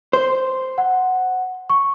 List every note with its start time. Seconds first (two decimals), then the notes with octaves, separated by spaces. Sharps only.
0.13 C5
0.78 F#5
1.70 C#6